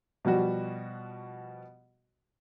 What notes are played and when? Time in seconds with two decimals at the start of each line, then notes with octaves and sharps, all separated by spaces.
0.25 B2 F3 G3 F#4